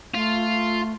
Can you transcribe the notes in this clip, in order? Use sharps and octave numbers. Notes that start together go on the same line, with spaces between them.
A3 F4